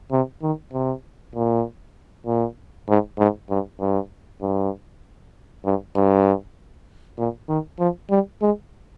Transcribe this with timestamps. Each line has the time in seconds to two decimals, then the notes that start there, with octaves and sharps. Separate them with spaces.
0.12 C3
0.42 D#3
0.73 C3
1.35 A#2
2.26 A#2
2.88 G#2
3.18 G#2
3.50 G2
3.80 G2
4.42 G2
5.65 G2
5.96 G2
7.19 A#2
7.49 D#3
7.79 F3
8.10 G3
8.42 G#3